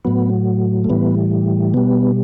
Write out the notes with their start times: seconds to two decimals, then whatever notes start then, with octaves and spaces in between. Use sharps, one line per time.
0.05 A2 F#3 B3
0.84 A3
0.90 A2 E3 G3 B3
1.74 B2 G3 B3